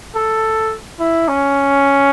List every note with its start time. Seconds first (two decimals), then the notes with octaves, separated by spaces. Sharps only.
0.15 A4
0.99 E4
1.28 C#4